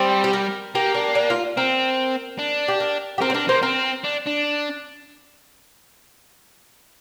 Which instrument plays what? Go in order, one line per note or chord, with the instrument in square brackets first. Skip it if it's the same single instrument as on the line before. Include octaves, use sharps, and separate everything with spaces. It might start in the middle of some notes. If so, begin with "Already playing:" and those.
Already playing: [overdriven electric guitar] G3 [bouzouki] C4
[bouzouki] G4
A#4
[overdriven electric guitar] A#3 [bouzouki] G4
[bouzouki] D4
D4
F4
[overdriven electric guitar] C4 [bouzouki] A#4
[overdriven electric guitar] D4
[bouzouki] G4
A#4
G4
[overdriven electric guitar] C4 [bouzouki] A#4
[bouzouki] C5
[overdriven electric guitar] D4 [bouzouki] A#4
[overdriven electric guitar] A#3 [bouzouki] C5
[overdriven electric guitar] C4 [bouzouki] A#4
[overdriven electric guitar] D4
D4